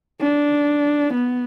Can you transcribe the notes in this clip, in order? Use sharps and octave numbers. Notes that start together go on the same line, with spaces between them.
D4
B3